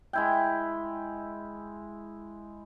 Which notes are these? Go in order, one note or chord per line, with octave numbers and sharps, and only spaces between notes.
G#3 E4 G5